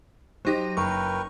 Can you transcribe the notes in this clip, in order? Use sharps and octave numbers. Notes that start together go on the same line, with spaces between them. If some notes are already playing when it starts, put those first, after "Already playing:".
F#3 D#4 G4 C5 A#6
F#1 A#4 B4 G5 C#6